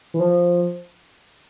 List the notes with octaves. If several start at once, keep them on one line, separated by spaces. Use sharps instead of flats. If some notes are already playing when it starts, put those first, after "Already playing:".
E3
F3